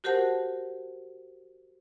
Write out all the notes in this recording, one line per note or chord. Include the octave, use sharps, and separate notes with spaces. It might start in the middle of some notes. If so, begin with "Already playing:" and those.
F#4 G4 A#4 C5 F#5 A5